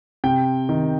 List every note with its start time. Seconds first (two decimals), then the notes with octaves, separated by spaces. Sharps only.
0.24 C3 G5
0.69 D#3